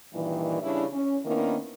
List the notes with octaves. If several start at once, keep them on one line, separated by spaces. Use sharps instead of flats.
G2 A#2 D#3 E3
C#3 G3 C#4 D4 E4
C#4
D#3 A#3 B3 C#4 D4 E4